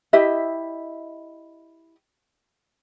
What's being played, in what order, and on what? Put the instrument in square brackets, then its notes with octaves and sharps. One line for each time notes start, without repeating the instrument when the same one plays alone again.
[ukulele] E4 G4 D#5 E5